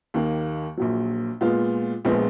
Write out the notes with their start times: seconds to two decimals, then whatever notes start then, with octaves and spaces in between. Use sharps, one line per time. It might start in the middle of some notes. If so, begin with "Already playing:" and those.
0.14 D#2 D#3 A#3
0.77 A#1 A#2 F#3
1.41 A#2 G#3 B3 F4
2.05 A#1 A#2 F3 G#3 B3